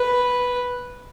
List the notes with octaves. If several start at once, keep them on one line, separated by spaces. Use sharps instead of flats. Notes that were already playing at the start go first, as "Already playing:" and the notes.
Already playing: B4